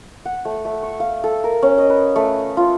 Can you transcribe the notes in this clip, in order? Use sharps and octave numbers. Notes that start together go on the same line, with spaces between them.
F#5
A3
A3
C#6
F5
A4
A#4
C#4
D#5
B4
A3
F4